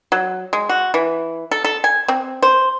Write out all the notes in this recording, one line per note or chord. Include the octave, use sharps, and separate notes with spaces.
F#3
G#3
F#4
E3
A4
A4
G#5
C4
C5